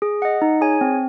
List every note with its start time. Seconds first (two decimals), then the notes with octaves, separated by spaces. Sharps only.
0.02 G#4
0.22 D#5 F#5
0.42 D#4
0.61 G#4 C#5 G#5
0.81 C4